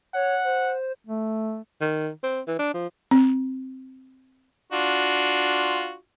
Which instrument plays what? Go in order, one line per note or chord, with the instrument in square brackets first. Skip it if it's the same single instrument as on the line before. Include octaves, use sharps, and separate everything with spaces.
[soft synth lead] C#5 [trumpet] F#5
[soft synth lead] C5
[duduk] A3
[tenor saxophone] D#3
C4
E3
D4
F3
[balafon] C4
[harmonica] D4 F4 F#4